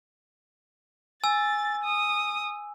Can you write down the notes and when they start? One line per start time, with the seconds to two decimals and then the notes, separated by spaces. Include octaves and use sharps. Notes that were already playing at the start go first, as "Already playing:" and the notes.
1.24 G#5 E6 A6
1.84 D#6